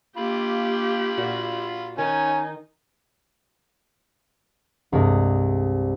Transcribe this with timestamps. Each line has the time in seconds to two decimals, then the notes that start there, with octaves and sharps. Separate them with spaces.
0.17 A#3 F4 G4 B5
1.17 A#2 F#4
1.98 D#3 C#4 D#4 G#5
4.92 C2 G2 G#3 A#6